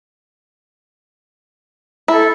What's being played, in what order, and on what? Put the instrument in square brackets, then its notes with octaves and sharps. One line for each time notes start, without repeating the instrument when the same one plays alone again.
[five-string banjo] E4 [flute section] A4